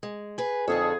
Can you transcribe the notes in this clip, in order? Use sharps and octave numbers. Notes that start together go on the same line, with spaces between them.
G#3
G#4 B4
F2 D3 D#4 G#4 A4